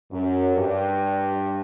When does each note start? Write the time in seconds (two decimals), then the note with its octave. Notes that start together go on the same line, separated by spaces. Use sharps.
0.12 F#2
0.56 G2